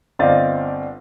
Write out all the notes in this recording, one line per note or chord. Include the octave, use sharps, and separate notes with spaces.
G1 C4 D5 D#5 F5 A6